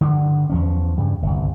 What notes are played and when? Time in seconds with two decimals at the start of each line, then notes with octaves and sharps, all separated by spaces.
0.01 G2 D3
0.50 E2 F3 C#4
0.98 G2 C#3
1.22 G1 C2